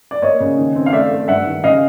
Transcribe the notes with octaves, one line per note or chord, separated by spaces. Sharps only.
D5
A#3 C#5 D#5
C#3
D#3
C4
F5
A3 D5 E5
A3
G2 E5 F#5
D#3
C#3 D#5 F5